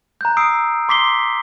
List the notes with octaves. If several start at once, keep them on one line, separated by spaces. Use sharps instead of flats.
A#5 F#6 G6
D#6 E6 C7 D7
C6 D6 B6 C7 G7